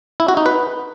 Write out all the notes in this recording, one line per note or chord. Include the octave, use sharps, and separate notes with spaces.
E4
F#4
D#4
B4